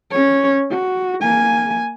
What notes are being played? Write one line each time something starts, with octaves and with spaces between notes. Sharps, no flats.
C#4 C#5
F#4
A#3 G#5